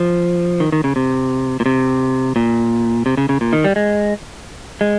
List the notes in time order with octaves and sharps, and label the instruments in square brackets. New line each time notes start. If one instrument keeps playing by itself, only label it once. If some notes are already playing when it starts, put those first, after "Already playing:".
Already playing: [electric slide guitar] F3
D#3
D#3
C#3
C3
A#2
C3
A#2
C3
C#3
C#3
A#2
D#3
G3
G#3
G#3